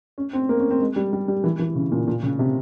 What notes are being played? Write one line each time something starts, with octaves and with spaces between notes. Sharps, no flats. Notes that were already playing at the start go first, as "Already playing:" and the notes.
C#4
C4
A#3
C#4
C4
G#3
G3
G3
G3
E3
E3
C#3
A#2
A#2
C#3
C3